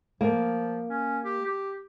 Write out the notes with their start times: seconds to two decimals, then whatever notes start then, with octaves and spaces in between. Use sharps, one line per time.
0.21 F3 A#3
0.90 C#4
1.24 G4
1.45 G4